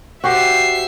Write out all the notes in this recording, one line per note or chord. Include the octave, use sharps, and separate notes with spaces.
F#4 G4 C5 E5 C7